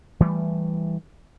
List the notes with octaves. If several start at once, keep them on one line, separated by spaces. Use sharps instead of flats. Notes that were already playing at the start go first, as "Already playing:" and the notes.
E3 G3 A3